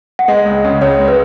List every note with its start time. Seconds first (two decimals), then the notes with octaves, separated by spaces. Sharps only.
0.19 F#5
0.28 G#3 D#5
0.45 C#2
0.65 C#3
0.81 C#2 C#5
0.99 G#3
1.08 B4